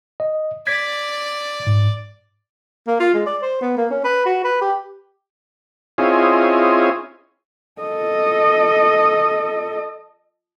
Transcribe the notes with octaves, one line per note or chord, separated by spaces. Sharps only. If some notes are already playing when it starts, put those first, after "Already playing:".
D#5
D5 G#6 B6
G#2
A#3
F4
G#3
D5
C5
B3
A#3
C#4
B4
F#4
B4
G4
C4 C#4 E4 F4 G#4 D#5
A4 D#5